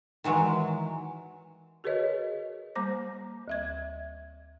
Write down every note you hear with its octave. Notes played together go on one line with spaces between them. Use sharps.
D#3 E3 F#3 G#3
F#4 G#4 A#4 B4 C#5 D#5
G3 A#3 C5 A#5 D6 A#6
D2 E5 G#6